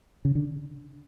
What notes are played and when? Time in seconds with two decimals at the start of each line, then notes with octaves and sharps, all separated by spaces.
0.25 C#3
0.35 D3